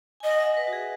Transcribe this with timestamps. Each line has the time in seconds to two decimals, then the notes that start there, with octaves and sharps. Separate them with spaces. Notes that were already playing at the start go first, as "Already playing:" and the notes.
0.20 D#5 G#5
0.31 F#5
0.40 E5
0.57 B4
0.67 F#4
0.73 G#4